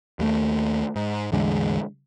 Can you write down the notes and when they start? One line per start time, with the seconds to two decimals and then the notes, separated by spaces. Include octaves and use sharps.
0.19 D#2 G3 A3
0.96 G#2
1.32 A1 E2 D3 G#3